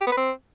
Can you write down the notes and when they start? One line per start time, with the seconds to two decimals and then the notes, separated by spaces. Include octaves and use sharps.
0.01 G4
0.06 B3
0.12 B4
0.17 C4